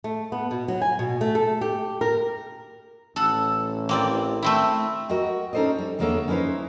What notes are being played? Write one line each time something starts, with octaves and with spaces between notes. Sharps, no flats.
A3
B3
B2
F#3
G#5
B2
A3
A4
G4
A#4
A1 A4 F#5
A#3 C4 D5
A3 C4 E4
F#4 A#4 D#5 G5
C#4 D#4 A4 C5 D5 D#5
G3
E2 D3 G#3 A#3 C#5 E5
C#4 D#4 E4 B4 C5